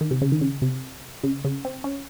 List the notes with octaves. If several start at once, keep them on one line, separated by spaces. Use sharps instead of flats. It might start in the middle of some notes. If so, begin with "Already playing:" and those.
D#3
C3
C#3
D#3
C#3
C3
C#3
C#3
C4
C#4